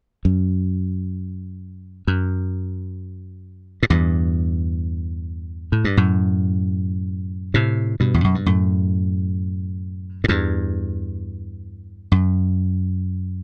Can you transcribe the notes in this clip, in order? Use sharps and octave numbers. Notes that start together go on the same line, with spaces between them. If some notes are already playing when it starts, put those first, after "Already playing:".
F#2
F#2
A2
E2 G2
A2
G2
F#2 A2
A2 C3
G2 B2
E2
F#2
G2
F#2 A2
A2
E2 G2
F#2